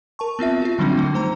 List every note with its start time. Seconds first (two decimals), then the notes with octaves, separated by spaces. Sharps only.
0.19 A#4 A5 C#6
0.39 B3 C4 F4 E5
0.62 F4 F#4
0.78 D3 F#3 G3 C4 D4 D#4
0.96 D3 A3 D#4
1.14 A3 C5 A#5